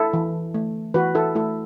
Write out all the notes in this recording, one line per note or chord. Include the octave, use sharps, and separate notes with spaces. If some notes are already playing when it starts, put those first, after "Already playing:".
Already playing: E4 A4
E3
A3
E3 F#4 B4
E4 A4
A3 E4 A4